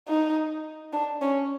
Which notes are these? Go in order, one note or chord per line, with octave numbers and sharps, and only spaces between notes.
D#4
D4
C#4